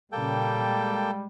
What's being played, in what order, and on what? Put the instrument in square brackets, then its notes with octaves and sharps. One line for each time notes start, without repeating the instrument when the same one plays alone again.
[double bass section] A#2 C#3 [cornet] G3 [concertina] A#3 A4 G5
[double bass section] G#3